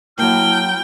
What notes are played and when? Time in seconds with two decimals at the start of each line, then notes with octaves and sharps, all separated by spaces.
0.18 F#3 A#3 E4 G5 A5 F6